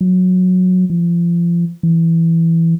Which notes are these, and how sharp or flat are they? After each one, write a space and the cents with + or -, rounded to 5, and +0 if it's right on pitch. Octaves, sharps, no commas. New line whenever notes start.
F#3 -15
F3 -30
E3 +5